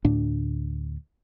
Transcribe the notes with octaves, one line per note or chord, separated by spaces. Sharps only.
D2 A2 D4